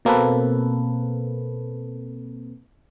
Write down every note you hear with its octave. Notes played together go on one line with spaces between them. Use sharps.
B2 A#3 C4 A4 B4